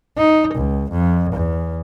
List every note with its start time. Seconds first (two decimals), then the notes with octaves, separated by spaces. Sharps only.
0.17 D#4
0.55 C#2
0.91 F2
1.33 E2